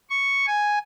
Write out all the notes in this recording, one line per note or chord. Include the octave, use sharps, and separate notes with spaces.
C#6
G#5